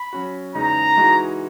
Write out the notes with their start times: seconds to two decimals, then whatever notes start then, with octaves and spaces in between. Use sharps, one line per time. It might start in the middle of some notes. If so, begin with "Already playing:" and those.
Already playing: B5
0.13 F#3 C#4 F#4
0.55 E2 C#3 G#3 D#4 A#5
0.97 E3 G#3 D#4 F#4